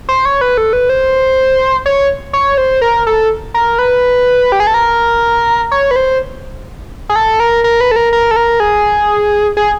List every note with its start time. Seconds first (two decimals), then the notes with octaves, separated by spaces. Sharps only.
0.09 C5
0.25 C#5
0.41 B4
0.58 A4
0.73 B4
0.89 C5
1.86 C#5
2.33 C#5
2.58 C5
2.81 A#4
3.07 A4
3.54 A#4
3.79 B4
4.52 G4
4.60 G#4
4.67 A4
4.74 A#4
5.72 C#5
5.91 B4
5.96 C5
7.09 G#4
7.16 A4
7.40 A#4
7.64 A#4
7.81 B4
7.91 A4
7.96 A#4
8.13 A#4
8.31 A4
8.36 A#4
8.60 G#4
9.57 G#4